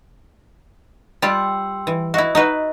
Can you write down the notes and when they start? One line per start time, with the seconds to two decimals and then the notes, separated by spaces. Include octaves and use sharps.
1.22 G3 F4 G4 G5 C6 E6
1.87 E3
2.14 E4 F#4 D#5 E5
2.35 D#4 F#4 B4